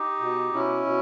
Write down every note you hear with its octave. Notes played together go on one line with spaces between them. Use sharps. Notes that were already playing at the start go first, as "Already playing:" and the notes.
Already playing: D#4 G4
B2
B2 C#4 E4
B2